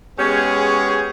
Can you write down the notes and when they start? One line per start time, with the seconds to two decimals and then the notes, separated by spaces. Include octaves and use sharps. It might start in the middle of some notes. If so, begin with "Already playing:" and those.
0.19 G#3 B3 C#4 G4 G#4 C#5